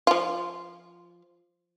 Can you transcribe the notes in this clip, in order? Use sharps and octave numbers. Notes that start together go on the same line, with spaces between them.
F3 F4